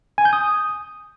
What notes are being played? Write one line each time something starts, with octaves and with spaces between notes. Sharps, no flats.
G#5
G6
D#6